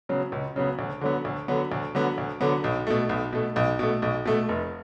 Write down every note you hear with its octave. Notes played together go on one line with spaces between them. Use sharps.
C#3 F#3 B3
C#2
C#3 F#3 B3
D2
D3 F#3 B3
D2
D3 F#3 B3
D2
D3 F#3 B3
D2
D3 F#3 B3
B1
B2 A3
B1
B2 A3
B1
B2 A3
B1
B2 A3
F1